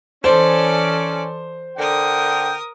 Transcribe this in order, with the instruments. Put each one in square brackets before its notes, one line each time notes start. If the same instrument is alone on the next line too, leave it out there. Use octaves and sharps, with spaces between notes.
[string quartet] E3 A4 D5 [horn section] C#4 [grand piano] C5
[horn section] D3 G5 [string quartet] A#4 D#6